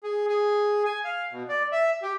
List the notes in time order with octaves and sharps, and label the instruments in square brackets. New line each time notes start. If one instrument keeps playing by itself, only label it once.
[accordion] G#4
G#4
G#5
F5
B2
D5
E5
G4